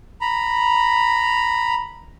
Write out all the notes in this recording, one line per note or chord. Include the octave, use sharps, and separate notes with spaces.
A#5 B5